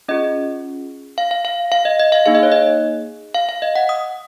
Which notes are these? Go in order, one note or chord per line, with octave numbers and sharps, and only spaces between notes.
C#4 F4 G#4 D#5
F5
F5
F5
F5
D#5
D#5
F5
A#3 D#4 G#4 F5
D#5
C#5
D#5
F5
F5
D#5
F#5
D#6